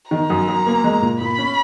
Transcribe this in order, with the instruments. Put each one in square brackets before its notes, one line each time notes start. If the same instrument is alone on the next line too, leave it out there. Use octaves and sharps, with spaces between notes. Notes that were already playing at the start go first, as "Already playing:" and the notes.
[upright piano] D#3 [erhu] A#5
[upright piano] F#2
F#2
A#3
G#3
A#2
[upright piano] A#2 [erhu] B5
[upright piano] C#4